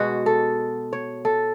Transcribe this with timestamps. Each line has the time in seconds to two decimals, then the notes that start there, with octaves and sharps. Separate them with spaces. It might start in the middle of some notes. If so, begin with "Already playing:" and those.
Already playing: B2 G#3 F#4
0.26 A4
0.93 C#5
1.25 A4